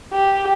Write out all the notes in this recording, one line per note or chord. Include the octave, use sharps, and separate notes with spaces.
G4